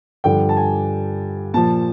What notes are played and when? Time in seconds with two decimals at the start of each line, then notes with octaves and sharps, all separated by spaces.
0.24 G2 D3 F3 G5
0.49 A5
0.57 G#5
1.54 A#2 F3 A5